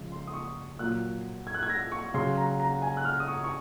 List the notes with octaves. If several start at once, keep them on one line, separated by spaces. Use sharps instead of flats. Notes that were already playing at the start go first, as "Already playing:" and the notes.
Already playing: C#3 F3 G#3
C6
D#6
C#6
A#2 F#3 F#6
G#6
F#6
G#6
A#6
C#6
C#3 F#3 C6
A#5
A#5
G#5
F#6
F6
D#6
C#6
C#6